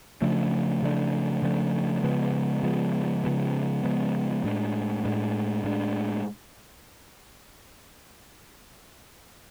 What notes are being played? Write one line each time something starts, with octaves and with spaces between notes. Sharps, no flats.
C#3 F3 A3 D4
C#3 F3 A3 D4
C#3 F3 A3 D4
C#3 F3 G#3 B3
C#3 F3 G#3 B3
C#3 F3 G#3 B3
C#3 F3 G#3 B3
A2 G#3 D4
A2 G#3 D4
A2 G#3 D4